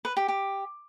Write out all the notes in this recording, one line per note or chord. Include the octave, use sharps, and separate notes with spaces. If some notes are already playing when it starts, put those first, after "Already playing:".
B4
G4
G4